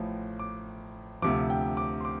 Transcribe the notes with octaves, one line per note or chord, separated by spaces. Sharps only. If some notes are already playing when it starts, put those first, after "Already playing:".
Already playing: A1 A2 F3
D6
D2 C3 F3 D6
G5
D6
C6
D6